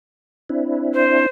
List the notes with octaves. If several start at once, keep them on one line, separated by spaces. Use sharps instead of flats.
C4 D4 E4
C5